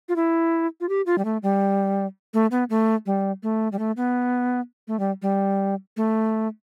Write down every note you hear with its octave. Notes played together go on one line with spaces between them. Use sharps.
F4
E4
F4
G4
F4
G3
A3
G3
A3
B3
A3
G3
A3
G3
A3
B3
A3
G3
G3
A3